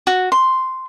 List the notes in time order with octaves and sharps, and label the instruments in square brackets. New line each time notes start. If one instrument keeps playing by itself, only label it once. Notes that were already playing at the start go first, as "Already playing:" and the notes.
[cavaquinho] F#4
C6